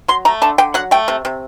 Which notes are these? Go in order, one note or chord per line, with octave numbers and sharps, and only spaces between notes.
F#3 C6
A3 A#5
D3 A5
D3 G5
F#3 F#5
A3 G5
C3
C3